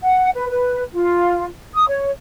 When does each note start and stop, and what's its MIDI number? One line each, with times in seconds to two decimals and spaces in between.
0.04 0.30 78
0.35 0.46 71
0.50 0.82 71
0.94 1.46 65
1.74 1.88 87
1.89 2.10 73